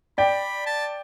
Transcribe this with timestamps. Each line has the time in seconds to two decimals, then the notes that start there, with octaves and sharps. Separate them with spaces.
0.18 D5 G5 B5
0.66 A5